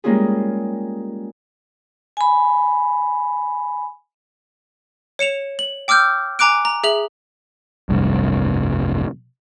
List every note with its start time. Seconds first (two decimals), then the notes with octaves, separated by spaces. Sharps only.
0.04 G3 G#3 A#3 C#4 F4 G#4
2.17 G#5 B5
5.19 C#5 C#7 E7 F7
5.59 F#7
5.88 G5 D6 E6 F6 G6
6.39 G#5 A#5 D6 F#6 D7
6.65 A#5
6.84 G#4 E5 F7 F#7
7.89 F1 C2 G2